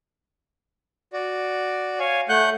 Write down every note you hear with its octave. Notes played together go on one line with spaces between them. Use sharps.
F#4 D5
C#5 F5 G#5
A3 F#5 F#6 G6